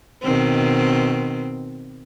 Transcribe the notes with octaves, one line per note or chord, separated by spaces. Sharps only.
B2 D#3 C4